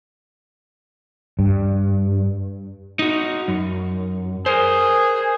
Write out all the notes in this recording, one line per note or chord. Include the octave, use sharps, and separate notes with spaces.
G2
D#4 F#4
F#2
G#4 A#4 C5